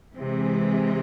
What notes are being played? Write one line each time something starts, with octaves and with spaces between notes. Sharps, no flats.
C3 E3 G#3